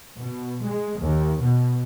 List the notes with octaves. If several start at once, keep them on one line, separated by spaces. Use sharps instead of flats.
B2
G#3
D#2
B2